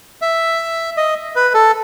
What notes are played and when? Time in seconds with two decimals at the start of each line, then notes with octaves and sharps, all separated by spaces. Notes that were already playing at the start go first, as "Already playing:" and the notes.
0.22 E5
0.97 D#5
1.36 B4
1.54 A4